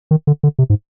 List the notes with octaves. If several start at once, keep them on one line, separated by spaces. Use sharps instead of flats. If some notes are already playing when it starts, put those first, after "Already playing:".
D#3
D3
D3
C3
G#2